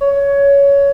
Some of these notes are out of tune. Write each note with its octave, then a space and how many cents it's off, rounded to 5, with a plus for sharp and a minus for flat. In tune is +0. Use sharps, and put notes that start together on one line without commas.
C#5 +15